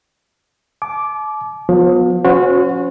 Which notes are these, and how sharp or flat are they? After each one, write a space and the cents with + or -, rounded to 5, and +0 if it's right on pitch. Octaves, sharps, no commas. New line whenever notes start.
A5 -40 D6 +0
F3 +40 B3 +0
C#4 +0 F#4 -25 C5 -40